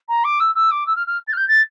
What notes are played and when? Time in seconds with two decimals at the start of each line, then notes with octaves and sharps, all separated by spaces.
0.08 A#5
0.24 D6
0.40 E6
0.55 E6
0.71 D6
0.87 E6
0.96 F6
1.07 F6
1.27 A6
1.33 F6
1.37 G6
1.48 A6